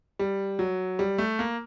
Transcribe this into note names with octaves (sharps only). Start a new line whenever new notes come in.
G3
F#3
G3
A3
A#3